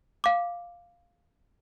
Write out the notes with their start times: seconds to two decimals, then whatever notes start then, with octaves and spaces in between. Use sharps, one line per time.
0.24 F5 D6